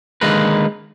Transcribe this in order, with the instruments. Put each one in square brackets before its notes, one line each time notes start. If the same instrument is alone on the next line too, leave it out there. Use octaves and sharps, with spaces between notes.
[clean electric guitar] D3 D#3 G#3 A#3 A#4 B4